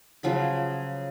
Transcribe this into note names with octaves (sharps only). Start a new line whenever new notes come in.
C#3 F3 F#3 B5